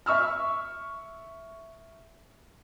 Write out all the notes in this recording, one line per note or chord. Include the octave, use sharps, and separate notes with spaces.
E5 C#6 E6 F6